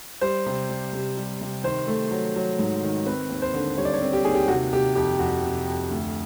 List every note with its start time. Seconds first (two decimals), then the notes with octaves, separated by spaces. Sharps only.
0.21 G3 C5
0.46 C3
0.69 G3
0.93 C3
1.17 G3
1.41 C3
1.64 D#3 C5
1.87 A3
2.11 F#3
2.36 F#3
2.59 G#2
2.83 D#3
3.06 C4 B4
3.29 D#2
3.42 C5
3.54 D3
3.77 G3 C#5
3.85 D5
3.93 C#5
4.02 C4
4.13 G4
4.25 D#2 G#4
4.35 G4
4.48 C3 F#4
4.73 C3 G4
4.95 F2 G4
5.19 F2 F#4
5.44 C3
5.67 F2
5.90 D2